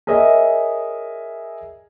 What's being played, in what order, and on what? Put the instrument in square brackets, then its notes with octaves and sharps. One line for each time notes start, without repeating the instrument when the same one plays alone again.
[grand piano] G#4 A#4 C#5 D#5 E5 G#5